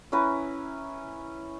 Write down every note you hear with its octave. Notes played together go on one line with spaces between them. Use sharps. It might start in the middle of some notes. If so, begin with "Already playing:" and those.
C#4 E4 B4 A#5